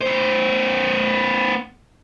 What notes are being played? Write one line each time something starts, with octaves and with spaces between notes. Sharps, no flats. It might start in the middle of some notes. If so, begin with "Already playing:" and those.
B3 C5